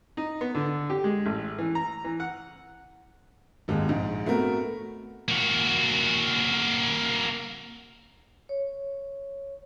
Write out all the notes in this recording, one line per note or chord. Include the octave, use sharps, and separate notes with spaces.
D#4
B3
D3
G4
G#3
A1
E3
A#5
E3
F#5
G#1 D#2 G#3
A#1 G#2
A3 B3 C4 F#4 A#4
A#3 F#4
C#5